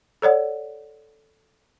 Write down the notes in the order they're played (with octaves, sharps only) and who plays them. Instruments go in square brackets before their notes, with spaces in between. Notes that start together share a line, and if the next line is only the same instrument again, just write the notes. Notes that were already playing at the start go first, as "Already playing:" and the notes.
[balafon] A4 C#5 D5 F#5